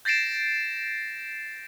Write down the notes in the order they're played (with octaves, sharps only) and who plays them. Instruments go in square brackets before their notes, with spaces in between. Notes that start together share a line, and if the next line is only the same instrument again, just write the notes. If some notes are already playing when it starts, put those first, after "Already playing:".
[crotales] G6 A6 A#6 C7 D7 E7